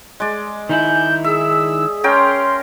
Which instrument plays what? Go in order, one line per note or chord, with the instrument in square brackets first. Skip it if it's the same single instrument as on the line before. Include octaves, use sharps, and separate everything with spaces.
[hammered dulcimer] G#3 D5
[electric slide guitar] D#3 D#4 E4 [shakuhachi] G#5 [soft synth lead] G6
[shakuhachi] G#4 [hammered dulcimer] E5 [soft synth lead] E6
[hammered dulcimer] C#4 A#4 G5 [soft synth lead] C6